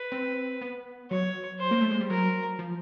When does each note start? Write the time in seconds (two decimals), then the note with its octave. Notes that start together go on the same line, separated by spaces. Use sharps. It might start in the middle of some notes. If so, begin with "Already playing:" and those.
Already playing: B4
0.12 C4
0.61 B3
1.11 F#3 C#5
1.60 C5
1.71 A#3
1.81 A3
1.91 G#3
2.01 G3
2.10 F#3 A#4
2.59 F3